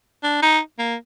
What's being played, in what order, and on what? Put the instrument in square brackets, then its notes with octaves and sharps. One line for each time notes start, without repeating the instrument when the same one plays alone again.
[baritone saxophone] D4
D#4
A#3